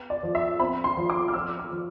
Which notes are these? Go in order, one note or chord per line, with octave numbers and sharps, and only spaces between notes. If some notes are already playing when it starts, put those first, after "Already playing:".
Already playing: B3
D5
F3
E5
C4 B5
C6
F3
D6
F6
F3 E6
F6
F3